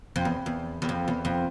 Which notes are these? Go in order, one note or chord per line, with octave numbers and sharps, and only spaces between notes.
F2
E2
E2
E2
F2
E2
F2